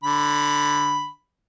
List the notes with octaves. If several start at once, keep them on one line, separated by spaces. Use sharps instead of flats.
D3 B5